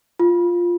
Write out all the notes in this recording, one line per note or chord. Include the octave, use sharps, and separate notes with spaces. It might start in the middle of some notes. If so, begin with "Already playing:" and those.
F4